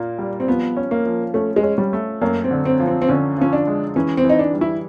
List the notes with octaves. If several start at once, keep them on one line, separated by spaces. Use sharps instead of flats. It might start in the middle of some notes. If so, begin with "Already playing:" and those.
Already playing: A#2 A#3
G3
C4
F3 B3
C#4
A#3
F3
A3 C#4
G#3
C#4
G3
A3
F#2 A#3
C4
D3
C4
F3
C4
C4
D3 C#4
F3 C#4
D4
G#3
E3 C#4
C4
E3
D#4
D4
G3
E4